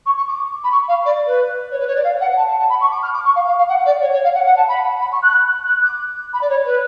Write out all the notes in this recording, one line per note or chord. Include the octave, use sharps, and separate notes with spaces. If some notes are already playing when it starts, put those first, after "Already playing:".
C#6
C#6
D6
B5
C#6
F5
D5
B4
C#5
B4
C#5
D5
F5
F#5
A5
A5
A5
B5
C#6
D6
F6
D6
C#6
F5
F5
F5
F#5
D5
C#5
C#5
F5
F#5
F#5
A5
B5
B5
C#6
F#6
F#6
D6
B5
D5
C#5
B4